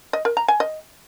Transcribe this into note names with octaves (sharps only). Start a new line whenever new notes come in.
D#5
A#4
A#5
G#5
D#5